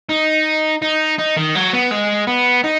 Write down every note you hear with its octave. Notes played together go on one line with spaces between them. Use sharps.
D#4
D#4
D#4
D#3
F#3
B3
G#3
B3
D#4